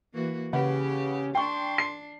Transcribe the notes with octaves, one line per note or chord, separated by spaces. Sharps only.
E3 A#3 F#4
C#3 G4 B4 F#5
D4 G5 C6 C#6
C7